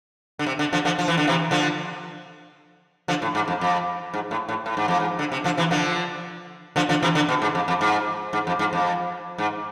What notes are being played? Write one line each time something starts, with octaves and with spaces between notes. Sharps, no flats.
D3
C3
D3
D3 F3
D3 F3
F3
E3
D3
C3 E3
D3 F3
D3 F3
A2
G#2
F2
F2
G#2
A2
A2
A2
G#2
F2
G#2
D3
C3
D3 F3
C3 E3
D3 F3
D3 F3
D3 F3
C3 E3
D3
B2
G#2
F2
F2
G#2
G#2
F2
G#2
F2
G#2